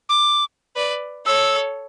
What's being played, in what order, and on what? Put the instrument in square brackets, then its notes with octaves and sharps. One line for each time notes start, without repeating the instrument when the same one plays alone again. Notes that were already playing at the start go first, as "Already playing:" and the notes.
[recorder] D6
[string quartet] B4 D5
[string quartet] A4 C#5 [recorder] E6